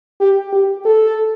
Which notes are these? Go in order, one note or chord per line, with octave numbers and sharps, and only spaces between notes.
G4
G4
A4